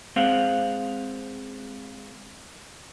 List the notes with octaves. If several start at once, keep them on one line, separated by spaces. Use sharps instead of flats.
G#3 C4 C5 F5 F#5